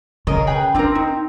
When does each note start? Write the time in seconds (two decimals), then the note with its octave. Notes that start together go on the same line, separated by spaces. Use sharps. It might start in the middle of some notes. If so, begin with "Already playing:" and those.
0.27 C#3 A#4 D#5
0.47 G#4 B4 G5
0.75 C4 D4 F4 A#4 A#5
0.95 D#4